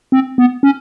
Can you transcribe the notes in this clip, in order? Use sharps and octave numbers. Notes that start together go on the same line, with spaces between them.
C4
B3
C#4